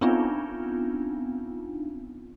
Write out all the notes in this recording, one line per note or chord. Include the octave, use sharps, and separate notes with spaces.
B3 C4 D4 D#4 F4